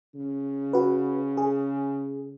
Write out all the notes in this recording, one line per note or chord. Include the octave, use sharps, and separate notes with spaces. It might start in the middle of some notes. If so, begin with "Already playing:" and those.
C#3
F#4 B4
G#4